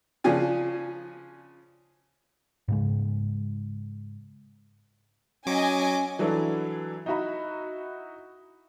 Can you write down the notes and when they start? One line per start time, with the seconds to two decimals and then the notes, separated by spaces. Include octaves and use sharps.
0.24 C#3 F3 D4 G#5
2.68 G#2 C#3 G#3
5.46 F#3 C#4 D#5 G#5 D6
6.19 E3 F#3 D4 E4 A4
7.06 D#4 E4 F#4 E5 A#5 B5